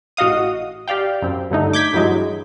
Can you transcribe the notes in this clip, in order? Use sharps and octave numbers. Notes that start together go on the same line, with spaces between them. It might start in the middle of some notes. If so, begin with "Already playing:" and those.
A1 F#4 D#5 F5 D#6
G4 D5 F5 G5
F#2 C4
G2 D3 A3 D#4
D6 G6 G#6 B6
G2 E3 F#3 G#3